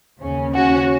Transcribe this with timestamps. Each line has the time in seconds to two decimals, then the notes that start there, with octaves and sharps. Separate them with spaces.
0.21 D#2 C#3 C#4
0.53 C#4 F#4